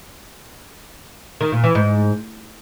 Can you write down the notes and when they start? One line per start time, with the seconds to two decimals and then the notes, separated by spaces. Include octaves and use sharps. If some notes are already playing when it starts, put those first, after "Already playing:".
1.41 D#3
1.52 A#2
1.64 E3
1.75 G#2